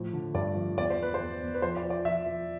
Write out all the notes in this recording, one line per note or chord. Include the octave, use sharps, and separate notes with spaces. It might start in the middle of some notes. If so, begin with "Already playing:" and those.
Already playing: A2 F3
D3
G2 D5
F3
E2 D5
C5
E2 B4
C5
E2
E2
B4
F3 C5
D5
F3
D5
F3 E5
F3